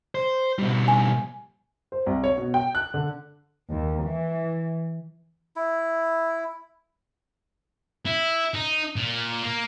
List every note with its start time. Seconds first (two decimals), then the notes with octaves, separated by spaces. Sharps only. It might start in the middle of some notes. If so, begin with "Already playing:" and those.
0.15 C5
0.59 B2 G3
0.88 G#5
1.92 C5
2.06 C2
2.24 C#5
2.38 B2
2.54 G5
2.75 F#6
2.94 D3
3.70 D#2
4.02 E3
5.56 E4
8.05 E4
8.54 D#4
8.96 A#2
9.43 A#3